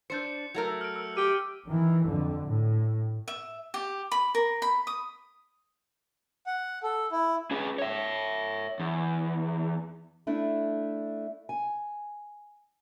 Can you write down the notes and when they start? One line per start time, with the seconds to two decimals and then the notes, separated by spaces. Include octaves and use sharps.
0.10 D4 C5 G6 C#7
0.54 F#3 A3 A#4
0.81 F6 D7
0.96 E6
1.17 G4 D#7 G7
1.65 D#3 E3
2.06 F2 D3
2.45 A2
3.28 E5
3.74 G4
4.12 B5
4.35 A#4
4.62 B5
4.87 D#6
6.47 F#5
6.83 A4
7.12 E4
7.51 C#4 G#4 B4
7.78 C#5 E5
8.80 E2
10.27 A3 D4 E4
11.49 G#5